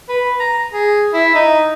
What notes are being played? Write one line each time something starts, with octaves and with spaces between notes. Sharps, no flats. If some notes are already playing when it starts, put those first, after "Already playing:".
B4
A#5
G#4
E4
D#4